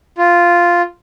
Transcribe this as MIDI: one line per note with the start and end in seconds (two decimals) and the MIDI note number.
0.18 0.82 65